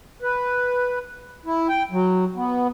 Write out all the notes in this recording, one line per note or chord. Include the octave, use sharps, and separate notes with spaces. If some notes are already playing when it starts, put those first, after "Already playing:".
B4
E4
G5
F#3
B3